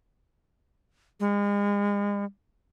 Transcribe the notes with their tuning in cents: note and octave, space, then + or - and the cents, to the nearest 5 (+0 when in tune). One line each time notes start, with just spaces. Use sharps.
G#3 -40